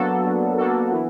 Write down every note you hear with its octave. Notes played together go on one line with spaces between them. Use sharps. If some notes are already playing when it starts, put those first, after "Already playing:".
Already playing: F#3 A#3 B3 D4 F#4 A4
F#3
A#3 D4 F#4 A4
E3